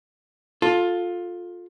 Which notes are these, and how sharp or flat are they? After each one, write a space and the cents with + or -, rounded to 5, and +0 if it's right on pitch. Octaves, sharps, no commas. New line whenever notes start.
F4 +15 A4 +0